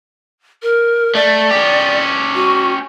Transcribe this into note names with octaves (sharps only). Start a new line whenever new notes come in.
A#4
A3 D5
C#4 G4
F#4